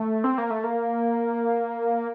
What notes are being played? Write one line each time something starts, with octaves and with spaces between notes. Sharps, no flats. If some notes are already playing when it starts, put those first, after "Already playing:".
Already playing: A3
C4
A#3
A3
A#3